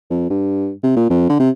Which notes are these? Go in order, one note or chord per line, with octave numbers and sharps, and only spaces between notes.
F2
G2
C3
A#2
F2
D3
C3